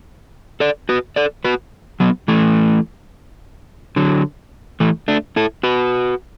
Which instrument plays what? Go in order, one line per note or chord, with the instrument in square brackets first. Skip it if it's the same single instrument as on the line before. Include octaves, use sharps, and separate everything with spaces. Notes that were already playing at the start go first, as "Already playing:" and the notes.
[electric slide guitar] A4 D5
F#4 B4
A4 D5
F#4 B4
F#3 B3
E3 A3
D3 F#3
E3 A3
A3 D4
E4 A4
F#4 B4